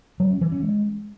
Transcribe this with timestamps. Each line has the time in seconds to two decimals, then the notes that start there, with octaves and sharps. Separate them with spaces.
0.20 F#3
0.31 C#4
0.41 E3
0.52 C#4
0.63 G#3